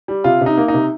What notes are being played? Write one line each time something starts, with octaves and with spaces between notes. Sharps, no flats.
G3
C3 F4
C3
D#4
A#3
D#4
C3